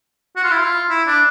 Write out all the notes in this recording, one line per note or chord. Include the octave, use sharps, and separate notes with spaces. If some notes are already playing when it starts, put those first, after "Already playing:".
F#4
F4
E4
F4
E4
D4